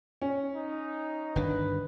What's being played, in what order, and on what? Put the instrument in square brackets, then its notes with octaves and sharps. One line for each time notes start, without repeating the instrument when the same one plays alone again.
[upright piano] C#4
[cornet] D#4
[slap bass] G1 D#3 D4 [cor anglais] B4